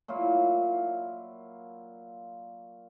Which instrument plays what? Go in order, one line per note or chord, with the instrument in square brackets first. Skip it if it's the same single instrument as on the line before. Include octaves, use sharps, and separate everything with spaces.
[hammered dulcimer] A#2 F#3 E4 F4